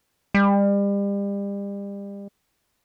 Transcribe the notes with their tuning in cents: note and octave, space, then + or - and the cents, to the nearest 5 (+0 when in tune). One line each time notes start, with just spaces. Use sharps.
G3 +35